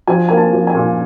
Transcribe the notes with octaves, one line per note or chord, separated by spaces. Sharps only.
F3 G#5
A#3 G#5
A5
F3
G#5
A#2